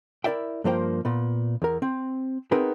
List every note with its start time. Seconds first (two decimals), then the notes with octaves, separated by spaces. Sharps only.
0.24 E4 A#4 D5 E5 G5
0.64 G2 F3 A#3 C5 G5
1.05 A#2 B3
1.62 E2 A#4
1.82 C4
2.52 B3 C4 D#4 G#4 A#4 B4